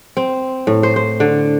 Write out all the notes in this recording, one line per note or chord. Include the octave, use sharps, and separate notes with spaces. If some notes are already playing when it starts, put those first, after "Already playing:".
C4
A2
C5
C5
D3